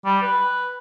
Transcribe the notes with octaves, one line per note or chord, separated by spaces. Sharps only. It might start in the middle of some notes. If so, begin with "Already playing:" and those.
G3
B4